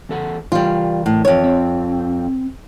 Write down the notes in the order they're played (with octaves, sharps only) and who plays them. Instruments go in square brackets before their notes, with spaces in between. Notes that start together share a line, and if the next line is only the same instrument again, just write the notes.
[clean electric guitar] E2 A4 F#5
[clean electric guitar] E3 A#4 [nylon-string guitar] G3 F4
[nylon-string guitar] A2
F2 C#5
[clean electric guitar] C4